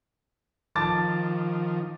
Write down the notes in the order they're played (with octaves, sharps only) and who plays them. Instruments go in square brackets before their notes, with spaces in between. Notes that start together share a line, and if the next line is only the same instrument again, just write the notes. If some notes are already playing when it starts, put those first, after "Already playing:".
[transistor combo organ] D#3 F3 [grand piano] A5 D6 A6